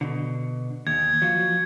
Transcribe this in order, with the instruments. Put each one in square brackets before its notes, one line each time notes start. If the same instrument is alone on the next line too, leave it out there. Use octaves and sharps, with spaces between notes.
[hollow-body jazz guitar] B2 D3
[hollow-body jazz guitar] D#2 [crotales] G#6
[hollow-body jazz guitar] F3 F#3